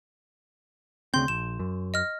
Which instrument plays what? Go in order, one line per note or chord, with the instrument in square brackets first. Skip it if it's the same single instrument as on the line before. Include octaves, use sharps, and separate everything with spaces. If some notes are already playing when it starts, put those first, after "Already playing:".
[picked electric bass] D2 C#3 C4 [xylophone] C6 G6
[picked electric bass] A#1 [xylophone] E7
[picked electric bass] F#2
[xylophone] D#5 F6